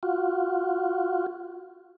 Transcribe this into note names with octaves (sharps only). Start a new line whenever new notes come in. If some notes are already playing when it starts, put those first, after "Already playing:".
F4 F#4